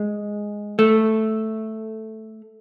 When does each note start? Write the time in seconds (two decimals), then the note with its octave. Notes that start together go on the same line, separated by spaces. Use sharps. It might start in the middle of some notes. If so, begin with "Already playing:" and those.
Already playing: G#3
0.79 A3